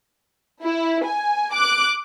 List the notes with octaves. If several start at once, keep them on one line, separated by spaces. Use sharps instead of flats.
E4
G#5
D6 F#6